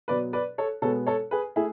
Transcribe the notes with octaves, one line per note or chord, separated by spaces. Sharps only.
B2 F#3 B3 B4 D5
B4 D5
A4 C#5
B2 G#3 B3 A4 C#5
A4 C#5
G#4 B4
A3 E4 G#4